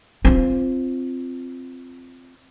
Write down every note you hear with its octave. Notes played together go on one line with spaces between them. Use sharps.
C4 F4